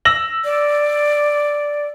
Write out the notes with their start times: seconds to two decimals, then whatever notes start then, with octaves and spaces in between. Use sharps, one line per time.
0.05 E6 A#6 F#7
0.45 D5